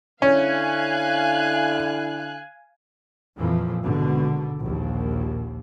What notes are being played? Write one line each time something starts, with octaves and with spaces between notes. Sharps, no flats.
D3 C#4 E4 F5 G#5 F#6
F2 A#2 E3 F3
G#1 B2 D3
A#1 D#2